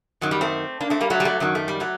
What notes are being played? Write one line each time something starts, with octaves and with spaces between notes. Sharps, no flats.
F#2 D#3 F#3
G3
A3 C4
A#3 D4
A3 C4
G3 A#3
F#3 A3
G3
F#3 A3
F#2 D#3 F#3
A3
G3
F#3 A3